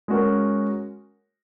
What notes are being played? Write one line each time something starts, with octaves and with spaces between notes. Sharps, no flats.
G#3 C#4 F#4 A#4